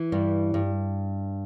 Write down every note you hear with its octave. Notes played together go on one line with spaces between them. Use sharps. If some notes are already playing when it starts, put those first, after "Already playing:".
Already playing: E3
G2 G3
G2